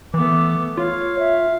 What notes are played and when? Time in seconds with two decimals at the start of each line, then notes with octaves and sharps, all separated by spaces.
0.14 E3 A3 B3 D6
0.77 F4 C#5 F5
1.19 E5